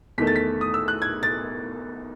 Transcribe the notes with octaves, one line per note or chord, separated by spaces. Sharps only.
E2 D#3 A3 B6
A6
B6
D#6
E6
F#6
G#6
A6